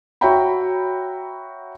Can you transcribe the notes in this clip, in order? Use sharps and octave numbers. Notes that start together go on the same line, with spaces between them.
F#4 C#5 E5 G5 A#5 B5